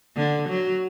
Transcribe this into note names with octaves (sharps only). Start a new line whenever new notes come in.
D3
F#3